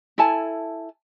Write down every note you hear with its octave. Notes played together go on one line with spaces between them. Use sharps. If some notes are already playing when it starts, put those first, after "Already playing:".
E4 A4 G#5 A5